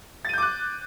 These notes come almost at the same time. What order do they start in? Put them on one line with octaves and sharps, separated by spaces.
A6 D#7 G6 D6 F#6